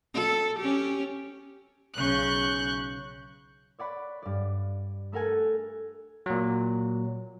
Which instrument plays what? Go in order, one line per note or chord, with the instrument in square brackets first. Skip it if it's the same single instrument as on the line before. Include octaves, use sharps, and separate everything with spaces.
[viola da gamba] A4
C#4 G4
[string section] B1 C#3 C#6 F#6 G6
[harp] C#5 D5 F#5 B5
G2 D5
A3 A4 A#4 F#5 G#5
[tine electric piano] A#2 F#3